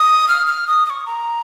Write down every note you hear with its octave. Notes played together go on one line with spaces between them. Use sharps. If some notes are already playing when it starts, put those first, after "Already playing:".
Already playing: D#6
F6
F6
D#6
D#6
C#6
A#5